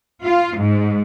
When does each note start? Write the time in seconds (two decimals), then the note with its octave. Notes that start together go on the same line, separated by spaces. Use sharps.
0.23 F4
0.58 G#2